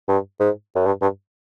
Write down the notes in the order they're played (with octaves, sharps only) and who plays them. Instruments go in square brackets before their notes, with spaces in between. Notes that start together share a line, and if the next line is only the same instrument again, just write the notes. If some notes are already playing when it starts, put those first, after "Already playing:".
[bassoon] G2
G#2
F#2
G2
G2